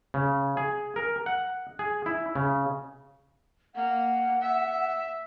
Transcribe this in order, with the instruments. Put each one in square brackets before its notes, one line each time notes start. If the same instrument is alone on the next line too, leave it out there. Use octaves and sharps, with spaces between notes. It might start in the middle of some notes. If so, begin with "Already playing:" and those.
[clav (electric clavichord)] C#3
G#4
A#4
F#5
G#4
E4
C#3
[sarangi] A#3 [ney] F#5
[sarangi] E5